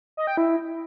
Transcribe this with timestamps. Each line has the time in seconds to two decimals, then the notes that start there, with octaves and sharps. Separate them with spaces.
0.17 D#5
0.27 G5
0.37 E4